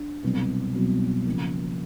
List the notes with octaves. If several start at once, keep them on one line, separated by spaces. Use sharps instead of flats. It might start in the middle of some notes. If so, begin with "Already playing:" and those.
Already playing: D4
C2 B2 F#3 B3
C2 B2 F#3 B3
C#3 F3 A#3